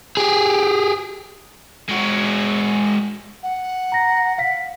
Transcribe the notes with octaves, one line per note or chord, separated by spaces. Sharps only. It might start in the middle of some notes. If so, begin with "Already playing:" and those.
G4 G#4
G#3 F#4
F#5
A#5 A#6
F5 B6